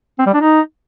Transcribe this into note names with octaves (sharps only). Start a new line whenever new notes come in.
C4
G3
D4
D#4